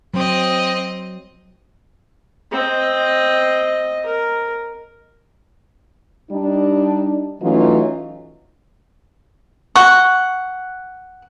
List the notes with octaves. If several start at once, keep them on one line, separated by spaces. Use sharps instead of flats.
F#3 C4 D#5
C4 D#5
A#4
G3 D4 D#4
E3 F#3 A3 C#4 D#4 F4
F#5 C#6